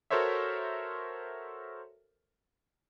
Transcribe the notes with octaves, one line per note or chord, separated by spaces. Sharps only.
F#4 A4 A#4 C5 C#5 E5